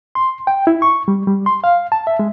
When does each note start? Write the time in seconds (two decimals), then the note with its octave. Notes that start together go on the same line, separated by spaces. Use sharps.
0.15 C6
0.47 G5
0.67 E4
0.82 C#6
1.08 G3
1.27 G3
1.46 C6
1.64 F5
1.92 A5
2.07 E5
2.19 G#3